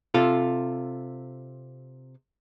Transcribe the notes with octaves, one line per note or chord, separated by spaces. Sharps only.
C3 F4 A4